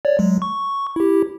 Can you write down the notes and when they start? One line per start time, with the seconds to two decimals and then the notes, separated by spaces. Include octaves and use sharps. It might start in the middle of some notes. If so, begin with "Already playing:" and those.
0.05 C#5 D5
0.19 F#3 G#3
0.42 C#6
0.96 E4 G4